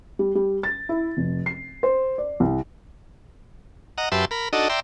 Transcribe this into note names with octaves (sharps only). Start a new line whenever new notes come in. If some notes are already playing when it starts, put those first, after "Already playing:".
G3
G3
A6
E4
F1
C7
C5
D5
C2
D#5 F#5 A#5
F#2 G4 B4 E5 A5 C6
A#4 B5
D4 D#4 F#4 A4 D#5
D5 E5 G5 A#5 C6